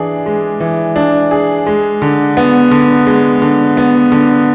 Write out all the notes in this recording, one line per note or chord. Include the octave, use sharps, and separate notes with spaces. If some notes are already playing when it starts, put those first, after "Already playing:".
Already playing: E3 D4 G#4
G#3
E3
D4
G#4
G#3
D3
B3
D3
G#3
D3
B3
D3